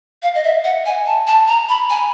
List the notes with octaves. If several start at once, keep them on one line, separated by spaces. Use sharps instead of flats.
F5
D#5
E5
F#5
G#5
A5
A5
A#5
B5
G#5